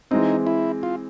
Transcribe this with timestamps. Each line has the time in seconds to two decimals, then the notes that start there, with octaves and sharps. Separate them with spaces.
0.11 E3 G#3 C4 D#4
0.47 E4
0.83 F4